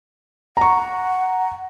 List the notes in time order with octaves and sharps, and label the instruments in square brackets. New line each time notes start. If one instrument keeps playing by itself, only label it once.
[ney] F#5 [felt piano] A#5 C#6